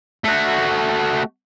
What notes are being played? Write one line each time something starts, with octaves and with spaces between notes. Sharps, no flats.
A3 F#4